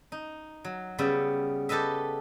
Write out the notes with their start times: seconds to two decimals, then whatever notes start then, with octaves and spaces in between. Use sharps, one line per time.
0.12 D#4
0.65 F#3
0.98 C#3 G3 B3 E5
1.69 G4 A4 B4 D#5 E5